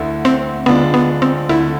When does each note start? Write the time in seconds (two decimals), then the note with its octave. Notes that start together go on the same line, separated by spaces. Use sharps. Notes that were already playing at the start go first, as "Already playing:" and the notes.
Already playing: D2 D3 A3 E4
0.25 C4
0.66 D3 G#3 B3 D4 F4
0.94 B3
1.22 C4
1.49 D2 D3 A3 E4